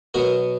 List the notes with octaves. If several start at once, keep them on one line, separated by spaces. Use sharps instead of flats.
B2 F#3 B3 F#4 A#4